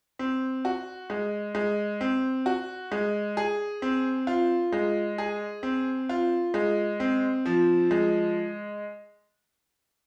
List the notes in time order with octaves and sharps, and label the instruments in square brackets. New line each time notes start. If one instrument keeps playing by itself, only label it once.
[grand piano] C4
F#4
G#3
G#3
C4
F#4
G#3
G#4
C4
F4
G#3
G#4
C4
F4
G#3
C4
F3
G#3